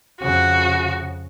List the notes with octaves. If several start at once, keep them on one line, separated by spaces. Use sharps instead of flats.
F2 C#3 F#4